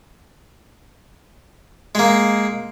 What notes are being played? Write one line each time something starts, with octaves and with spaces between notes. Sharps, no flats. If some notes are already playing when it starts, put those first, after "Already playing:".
G#3 A#3